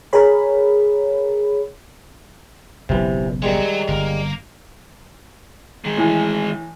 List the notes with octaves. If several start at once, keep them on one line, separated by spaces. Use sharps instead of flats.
G#4 A#4 C#5 B5
F#1 B1 F#2 C3 E3
D#3 G3 G#3 C#5 A#5
G1 A#3
D#3 G#3
A2 E3